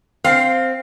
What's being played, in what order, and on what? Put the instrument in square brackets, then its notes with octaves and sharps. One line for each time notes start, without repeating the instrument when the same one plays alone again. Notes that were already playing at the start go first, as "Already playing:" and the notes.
[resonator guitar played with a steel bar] C4 [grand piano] F5